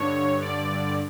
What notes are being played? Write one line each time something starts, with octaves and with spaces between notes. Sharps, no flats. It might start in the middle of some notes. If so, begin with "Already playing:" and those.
Already playing: G2 D3 C#5
D5